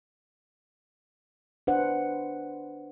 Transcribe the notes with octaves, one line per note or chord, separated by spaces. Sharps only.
D4 B4 C5 F#5